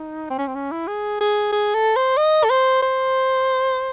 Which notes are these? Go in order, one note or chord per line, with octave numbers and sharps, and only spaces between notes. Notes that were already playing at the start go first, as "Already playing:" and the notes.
Already playing: D#4
C4
C#4
C4
C#4
E4
G#4
G#4
G#4
A4
C5
D#5
A4
C5
C5